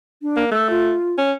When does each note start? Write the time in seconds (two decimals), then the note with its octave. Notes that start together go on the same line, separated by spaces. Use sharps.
0.22 D4
0.37 A#3
0.52 A3 E6
0.70 F4
1.18 C#4